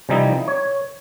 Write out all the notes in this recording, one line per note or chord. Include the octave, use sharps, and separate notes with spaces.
C3 E3 F3 G3 D#4 E4
C#5